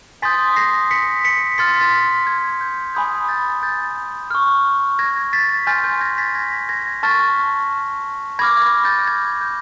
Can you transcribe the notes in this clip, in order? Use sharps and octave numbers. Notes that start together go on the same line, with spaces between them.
G#5 C6 D#6 G6 A6 B6
A#6 C7
B6 C#7
B6 C#7
C6 F6 A6 B6
A6 B6
G#6
G6
G#5 B5 D#6 G6 G#6
G6 A6
G6 A6
C#6 F6
G#6 A#6
A6 B6
G#5 C6 F6 G6 A6
G6 A6
G#6 A#6
A6 B6
G#6 A#6
G#6 A#6
A5 C#6 F6 A6 B6
B5 D6 F6 G#6 A#6
G#6 A#6
G6 A6
G#6
G6